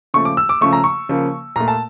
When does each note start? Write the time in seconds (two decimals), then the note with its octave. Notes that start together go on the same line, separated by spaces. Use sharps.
0.14 C#3 F3 A3 C#6
0.25 D6
0.37 E6
0.49 D6
0.61 C#3 F3 A3 C#6
0.73 A#5
0.84 C#6
1.09 C#3 F3 A#3
1.56 A#2 A3 A#5
1.68 A5